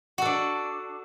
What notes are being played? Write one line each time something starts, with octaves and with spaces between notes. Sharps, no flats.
D4 F#4 A4